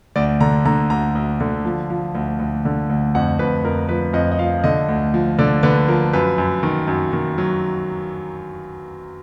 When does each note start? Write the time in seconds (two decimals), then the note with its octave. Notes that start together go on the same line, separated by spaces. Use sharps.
0.16 D2 D5
0.41 D3 A#5
0.65 D3 A#5
0.90 D2 A#5
1.15 D2
1.40 D3
1.65 F3
1.90 F3
2.15 D2
2.40 D2
2.65 D3
2.90 D2
3.15 F2 F#5
3.39 F2 B4
3.64 F2 A#4
3.89 F3 B4
4.13 F2 D#5
4.32 D#5
4.39 F3 F5
4.64 D3 D#5
4.89 D2
5.14 F3
5.39 D3 D5
5.63 D3 B4
5.88 F3 A#4
6.13 F#2 B4
6.38 F#2
6.63 D#3
6.88 F#2
7.13 D#3
7.38 F#3